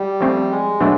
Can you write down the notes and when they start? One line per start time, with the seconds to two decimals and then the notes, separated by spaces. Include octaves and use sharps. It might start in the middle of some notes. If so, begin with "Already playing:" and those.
Already playing: G3
0.21 F3 A3 C4
0.51 G#3
0.80 B2 F#3 A3 D4